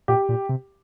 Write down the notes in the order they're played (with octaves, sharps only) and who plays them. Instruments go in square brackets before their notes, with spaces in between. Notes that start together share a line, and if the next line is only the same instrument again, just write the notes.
[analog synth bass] A#2 [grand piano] G4
[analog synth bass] A#2
C3